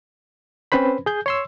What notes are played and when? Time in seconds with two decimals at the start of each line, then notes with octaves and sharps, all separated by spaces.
0.72 C4 C#4 B4 C5 B5
1.06 G#4 G6
1.26 C#5 C6 E6